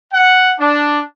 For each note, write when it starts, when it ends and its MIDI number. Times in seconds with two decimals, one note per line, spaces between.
0.13 0.53 78
0.59 1.01 62